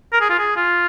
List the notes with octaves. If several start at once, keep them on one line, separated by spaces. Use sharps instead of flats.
A#4
G#4
F4
G#4
F4